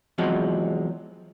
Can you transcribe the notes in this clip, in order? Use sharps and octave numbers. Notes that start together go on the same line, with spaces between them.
E2 C3 F3 F#3 G#3